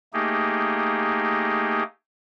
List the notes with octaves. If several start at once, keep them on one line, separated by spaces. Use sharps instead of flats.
A3 A#3 D#4 G4 G#4